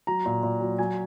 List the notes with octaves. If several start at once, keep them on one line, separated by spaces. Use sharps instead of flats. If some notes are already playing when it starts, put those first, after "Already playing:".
F#3 A#5
A#2
A#2
F#3
F#3 G#5